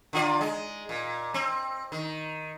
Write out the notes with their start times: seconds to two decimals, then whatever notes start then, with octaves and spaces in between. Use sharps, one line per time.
0.13 D3 F4 D5
0.41 G#3
0.89 A#2
1.34 C4
1.92 D#3